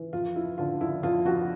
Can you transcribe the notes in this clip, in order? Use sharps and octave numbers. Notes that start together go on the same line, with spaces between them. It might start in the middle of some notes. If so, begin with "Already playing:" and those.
Already playing: E3
F2 F4
F3 E4
D3 F4
F2 E4
F2 F4
F3 F#4